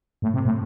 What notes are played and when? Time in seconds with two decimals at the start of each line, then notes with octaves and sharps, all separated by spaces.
0.22 A2
0.34 C3
0.45 A2